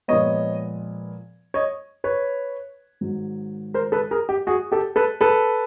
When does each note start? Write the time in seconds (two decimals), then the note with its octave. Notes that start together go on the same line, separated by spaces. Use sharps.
0.08 A#2 F3 G#3 B3 C#5 D#5
1.54 C#5 D#5
2.04 B4 C#5
3.01 G#2 D#3 F#3
3.74 A#4 C5
3.92 A4 B4
4.11 G#4 A#4
4.29 G4
4.47 F#4 G#4
4.72 G4 A4
4.96 A4 B4
5.21 A4 B4